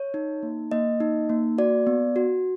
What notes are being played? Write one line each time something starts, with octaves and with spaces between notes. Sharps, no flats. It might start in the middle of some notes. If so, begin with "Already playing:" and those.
Already playing: C#5
D#4
A#3
A#3 D#5
D#4
A#3
F#4 D5
B3
F#4